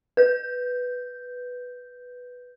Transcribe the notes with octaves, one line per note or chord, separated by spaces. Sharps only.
B4 G6